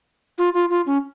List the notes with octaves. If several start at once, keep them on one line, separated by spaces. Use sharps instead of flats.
F4
F4
F4
C#4